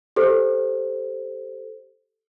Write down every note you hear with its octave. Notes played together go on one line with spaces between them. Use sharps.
G4 A4 C5